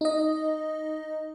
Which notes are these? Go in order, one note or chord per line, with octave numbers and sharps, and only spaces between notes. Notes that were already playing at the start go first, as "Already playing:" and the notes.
D#4 D#5